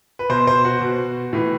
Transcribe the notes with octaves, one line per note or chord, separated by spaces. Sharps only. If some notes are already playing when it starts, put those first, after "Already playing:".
B4
B2 C5
C5
F#4
B2
A2 E3